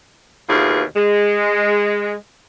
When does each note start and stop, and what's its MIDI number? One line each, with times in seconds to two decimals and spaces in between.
0.49 0.83 39
0.49 0.83 47
0.49 0.83 52
0.49 0.83 65
0.49 0.83 68
0.96 2.14 56